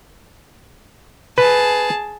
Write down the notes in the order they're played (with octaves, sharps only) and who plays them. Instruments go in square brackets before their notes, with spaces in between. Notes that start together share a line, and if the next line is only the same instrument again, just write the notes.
[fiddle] G#4 A5 [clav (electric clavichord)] B4